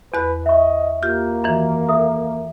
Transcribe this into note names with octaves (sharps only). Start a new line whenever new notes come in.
E2 B4 F#6
D#5 E5 C#6
A#3 F4 G4
F#2 D#3 E3
A4 E5 D#6